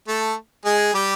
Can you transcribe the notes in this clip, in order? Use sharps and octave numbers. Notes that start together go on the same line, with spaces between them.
A3 A4
G#3 G#4
G3 G4